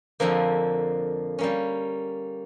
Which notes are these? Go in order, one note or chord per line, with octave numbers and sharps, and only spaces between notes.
F2 D3 F3 A#3
G3 A#3 C#4